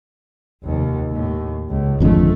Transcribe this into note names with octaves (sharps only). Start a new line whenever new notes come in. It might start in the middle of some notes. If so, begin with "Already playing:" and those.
F1 D#2
D#2 A2
C#2
G#1 F2 D3 G#3 A3